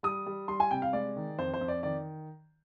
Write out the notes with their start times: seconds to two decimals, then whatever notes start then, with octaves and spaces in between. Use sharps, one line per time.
0.03 G3 D#6
0.26 G3
0.48 G3 C6
0.60 G#5
0.71 C3 G5
0.82 F5
0.93 G#3 D5
1.16 D#3
1.38 F2 C5
1.54 C5
1.61 F2
1.68 D5
1.83 D#3 D5